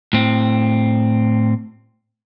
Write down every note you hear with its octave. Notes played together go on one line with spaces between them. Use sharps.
A2 C4